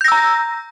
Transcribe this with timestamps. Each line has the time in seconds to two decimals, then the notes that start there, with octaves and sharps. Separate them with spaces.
0.01 G6
0.04 A#6
0.08 E6
0.12 A#5